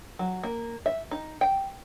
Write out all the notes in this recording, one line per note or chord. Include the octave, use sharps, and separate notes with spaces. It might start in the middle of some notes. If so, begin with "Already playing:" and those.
F#3
A#3
E5
D#4
G5